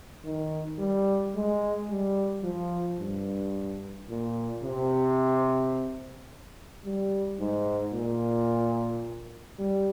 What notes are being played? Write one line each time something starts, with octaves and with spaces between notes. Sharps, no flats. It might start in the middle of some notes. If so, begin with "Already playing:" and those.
D#3
G3
G#3
G3
F3
G2
A#2
C3
G3
G#2
A#2
G3